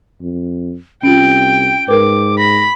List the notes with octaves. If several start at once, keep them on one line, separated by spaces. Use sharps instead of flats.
F2
C2 C#4 F4 G5 D7
G#2 A#4 B4 D6
B5 A#6